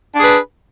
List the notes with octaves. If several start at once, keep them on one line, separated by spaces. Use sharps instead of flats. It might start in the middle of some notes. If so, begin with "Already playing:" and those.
D4 G#4 B4